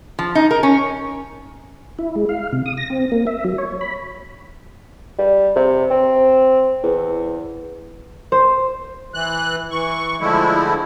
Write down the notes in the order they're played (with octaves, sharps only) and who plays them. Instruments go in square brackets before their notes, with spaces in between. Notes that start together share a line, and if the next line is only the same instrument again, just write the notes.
[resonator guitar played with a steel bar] F3
D#4
A#4
C#4
[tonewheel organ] E4
G#3
F5
C3
D#6
A#6
C4
A#3
E5
F#3
C#5
B5
[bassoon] G3
C3
C4
E2
[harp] C5
[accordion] E3 F#6
E3 C#6
D3 F3 G#3 A3 E4